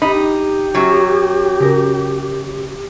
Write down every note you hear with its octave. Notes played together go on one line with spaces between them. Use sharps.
D#4 G4 B5
F#2 F#3
C#3 A#4